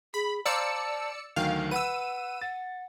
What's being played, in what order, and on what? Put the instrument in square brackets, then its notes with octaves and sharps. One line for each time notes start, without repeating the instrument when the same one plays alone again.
[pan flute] G#4 [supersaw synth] B5
[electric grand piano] C5 F5 A#5 [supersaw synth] D5 E6 C#7 [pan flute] A5
[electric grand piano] D2 D#3 F#3 [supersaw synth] F5 [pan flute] G5
[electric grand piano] B4 [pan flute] F#5 [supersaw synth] E6 D#7
[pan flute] F#5 [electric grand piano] A6